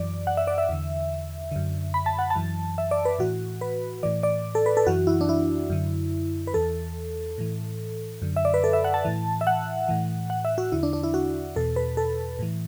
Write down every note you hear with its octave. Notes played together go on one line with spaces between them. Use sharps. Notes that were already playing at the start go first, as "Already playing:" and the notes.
Already playing: F#2 E3 D5
F#5
E5
D5
E5
E2 D3
F#2 D3
B5
A5
F#5
A5
F#2 E3
E5
D5
B4
A2 E3 F#4
B4
A2 E3 D5
D5
A4
B4
A4
F#2 E3 F#4
E4
D4
E4
F#2 D3
B4
E2 E3 A4
A2 E3
F#2 D3
E5
D5
B4
A4
E5
F#5
A5
A2 E3
E5
F#5
A2 E3
F#5
E5
F#4
E2 D3 E4
D4
D4
E4
F#4
E2 B2 A4
B4
A4
A2 E3